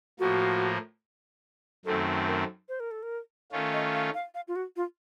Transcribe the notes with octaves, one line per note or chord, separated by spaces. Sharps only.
A2 F3 A#3 F#4
F#2 D#3 A3 C4 A4
A#4
C5
A#4
A4
A#4
D#3 A3 C#4 F4
D#5
F5
F5
F5
F4
F#4
F4